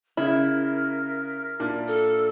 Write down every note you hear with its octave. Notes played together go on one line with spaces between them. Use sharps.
C#3 E4 A#4 E5 F6
A#2 D4
A4